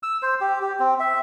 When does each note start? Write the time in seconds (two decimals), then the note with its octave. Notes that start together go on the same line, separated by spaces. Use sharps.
0.03 E6
0.22 C5
0.41 G4
0.62 G4
0.80 C4
1.00 E5